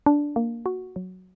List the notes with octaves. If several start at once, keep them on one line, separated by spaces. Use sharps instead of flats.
D4
A#3
F#4
F#3